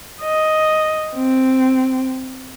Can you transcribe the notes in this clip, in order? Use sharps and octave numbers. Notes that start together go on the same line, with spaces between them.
D#5
C4